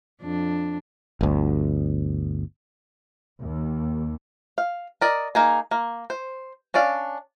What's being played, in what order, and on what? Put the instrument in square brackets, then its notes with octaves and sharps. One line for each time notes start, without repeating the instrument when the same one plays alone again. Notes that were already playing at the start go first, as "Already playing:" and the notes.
[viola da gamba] F2 D4
[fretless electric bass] G1 D2
[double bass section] D#2
[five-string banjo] F5
A#4 D5 D#5
A#3 D#4 G#4
A#3
C5
C#4 D4 D5 F5